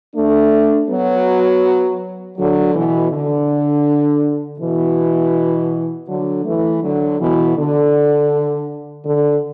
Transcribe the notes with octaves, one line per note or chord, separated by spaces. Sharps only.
A3 D4
F#3 B3
D3 F#3
B2 E3
D3
B2 E3
D3 F#3
E3 A3
D3 F#3
B2 E3
D3
D3